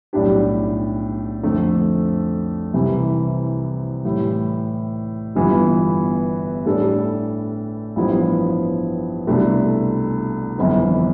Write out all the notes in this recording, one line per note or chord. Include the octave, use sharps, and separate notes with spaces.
B1 A2 G3 D4 G4
F2 D3 A3
C2 C3 E3
A2 E3 G3
G1 G2 E3 B3 F4
A2 G3 D4 A4
A1 G2 F3 B3 E4
C2 B2 A3 D4 A4
G1 F2 E3 B3